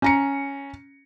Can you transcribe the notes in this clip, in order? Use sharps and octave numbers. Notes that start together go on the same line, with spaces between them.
C#4 A#5 C#7